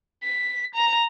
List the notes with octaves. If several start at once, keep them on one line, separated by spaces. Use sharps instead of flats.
B6
A#5